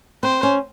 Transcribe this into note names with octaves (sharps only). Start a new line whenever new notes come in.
C4 C5
C#4